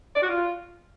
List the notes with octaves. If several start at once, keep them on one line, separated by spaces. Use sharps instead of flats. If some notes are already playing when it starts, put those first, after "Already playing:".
D5
F#4
F4